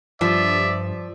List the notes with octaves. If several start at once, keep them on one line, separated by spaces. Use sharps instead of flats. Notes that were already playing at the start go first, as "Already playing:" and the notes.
G2 F3 D5 E5